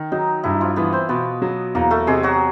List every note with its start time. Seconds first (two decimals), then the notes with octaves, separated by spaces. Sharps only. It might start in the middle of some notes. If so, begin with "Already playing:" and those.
Already playing: D#3
0.12 F#3 D#4
0.44 G2 E4
0.61 F3 F4
0.76 E3 B3 B4
0.92 C4 C5
1.09 B2 B3 B4
1.42 F#3
1.75 E2 A#3 A#4
1.91 A3 A4
2.07 C3 G#3 G#4
2.23 F#3 F#4